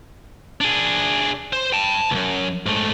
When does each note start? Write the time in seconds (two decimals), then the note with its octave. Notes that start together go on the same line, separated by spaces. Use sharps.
0.61 D4 G#4
1.53 C5
1.73 G5 A5
2.11 C#2 F#2
2.66 G#2 A3